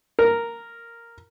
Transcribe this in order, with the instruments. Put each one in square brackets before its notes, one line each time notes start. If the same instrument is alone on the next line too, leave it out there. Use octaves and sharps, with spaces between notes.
[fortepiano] A#4